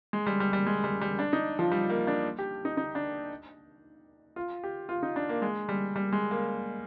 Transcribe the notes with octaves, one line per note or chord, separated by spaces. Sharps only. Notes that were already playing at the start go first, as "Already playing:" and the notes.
G#3
G3
G3
G3
G#3
G3
G3
D4
D#4
F3
G3
A#3
D4
G4
D#4
D#4
D4
F4
G4
F4
D#4
D4
A#3
G#3
G3
G3
G#3
A#3